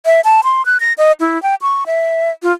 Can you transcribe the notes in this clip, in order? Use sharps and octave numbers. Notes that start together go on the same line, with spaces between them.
E5
A5
C6
F#6
A#6
D#5
E4
G5
C#6
E5
F4